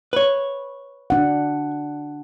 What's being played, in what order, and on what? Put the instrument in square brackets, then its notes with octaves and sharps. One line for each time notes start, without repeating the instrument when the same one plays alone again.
[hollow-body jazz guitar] B4 C#5
[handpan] D4 F#5